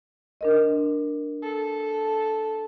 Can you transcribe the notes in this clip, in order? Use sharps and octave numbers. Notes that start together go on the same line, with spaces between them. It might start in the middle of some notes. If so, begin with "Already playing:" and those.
D4 A#4 D#5
A4